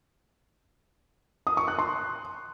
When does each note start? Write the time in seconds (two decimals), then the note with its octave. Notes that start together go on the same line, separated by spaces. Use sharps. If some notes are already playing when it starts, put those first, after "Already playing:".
1.47 D#6
1.57 C#6
1.68 F#6
1.79 C6